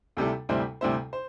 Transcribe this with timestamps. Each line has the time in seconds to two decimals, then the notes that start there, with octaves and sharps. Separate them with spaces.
0.17 D2 C3 G3 E4 A4
0.49 D2 C3 G3 E4 C5
0.81 D2 C3 G3 E4 C5
1.13 C5